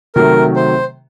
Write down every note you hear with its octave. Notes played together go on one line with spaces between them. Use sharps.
C3 D#3 F#3 A3 A#4
C5